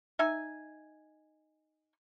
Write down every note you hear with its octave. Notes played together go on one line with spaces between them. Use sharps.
D#4 E5 G#5